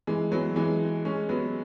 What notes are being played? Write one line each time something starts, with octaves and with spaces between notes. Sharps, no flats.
E3 G#3
F#3 B3
E3 G#3
G#3 C#4
F#3 B3